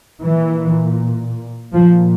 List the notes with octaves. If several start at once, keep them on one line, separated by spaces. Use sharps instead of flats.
A#2 E3
A#2 F3